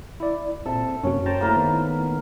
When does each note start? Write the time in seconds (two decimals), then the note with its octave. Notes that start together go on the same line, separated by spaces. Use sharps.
0.20 E4 D5
0.66 A#2 C4 A4 E5
1.03 F#2 C3 A#3 C#4 F#4
1.26 C5 G5 A5 A#5
1.41 A3 A#3 E4 A#4 B5
1.56 D#3 B3